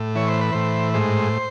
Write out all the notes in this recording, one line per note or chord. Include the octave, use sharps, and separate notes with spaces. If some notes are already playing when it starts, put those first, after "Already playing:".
Already playing: A2
E3 C#5
C5
B4
A2 C5
G#2 C5